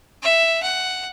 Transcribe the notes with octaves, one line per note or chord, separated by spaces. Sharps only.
E5
F#5